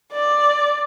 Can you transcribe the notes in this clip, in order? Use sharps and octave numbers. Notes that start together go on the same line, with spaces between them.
D5